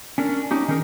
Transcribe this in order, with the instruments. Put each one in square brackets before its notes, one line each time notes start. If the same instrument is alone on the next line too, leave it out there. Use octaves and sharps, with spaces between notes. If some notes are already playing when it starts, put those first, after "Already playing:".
[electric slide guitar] C#4 D4 A#4
C#4 D#4 G4
D#3 C#4 G#4 A#4